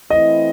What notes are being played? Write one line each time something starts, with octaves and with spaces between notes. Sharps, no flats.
E3 A3 C4 E4 D#5